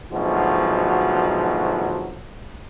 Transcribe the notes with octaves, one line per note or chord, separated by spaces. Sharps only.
D2 G#2 B2 F3 F#3